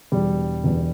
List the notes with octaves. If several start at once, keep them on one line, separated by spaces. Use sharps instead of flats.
E1 E2 B2 G3
E1 E2 B2